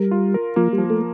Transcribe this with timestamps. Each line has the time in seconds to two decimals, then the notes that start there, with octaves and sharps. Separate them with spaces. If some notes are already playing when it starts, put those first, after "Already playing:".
Already playing: G3 A#4
0.11 F4
0.34 A#4
0.56 F3 A#3
0.73 G3
0.78 F3
0.90 A3